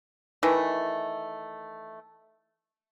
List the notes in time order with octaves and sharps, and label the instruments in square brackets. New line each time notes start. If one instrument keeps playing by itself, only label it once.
[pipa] D#3 E3 A3